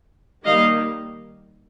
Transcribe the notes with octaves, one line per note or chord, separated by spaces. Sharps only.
D#3 G3 A#3 D#5 F5